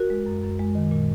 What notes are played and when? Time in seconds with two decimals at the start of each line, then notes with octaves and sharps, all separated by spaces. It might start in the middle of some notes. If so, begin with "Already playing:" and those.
Already playing: F#4 A#4
0.10 G#3
0.26 F#2
0.43 F#2
0.59 G#3
0.75 D#3
0.91 A#2